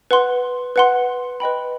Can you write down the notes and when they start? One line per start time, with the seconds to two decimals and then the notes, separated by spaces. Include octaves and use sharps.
0.11 B4 F#5 C6
0.76 B4 F#5 C6
1.40 B4 D#5 G5 B5